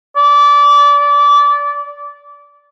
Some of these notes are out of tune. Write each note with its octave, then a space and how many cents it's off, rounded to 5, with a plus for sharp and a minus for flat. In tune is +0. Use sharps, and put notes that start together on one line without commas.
D5 -25